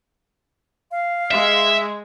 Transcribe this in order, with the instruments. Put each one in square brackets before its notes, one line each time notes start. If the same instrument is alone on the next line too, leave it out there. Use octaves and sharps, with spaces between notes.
[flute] F5
[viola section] G#3 [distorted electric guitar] E5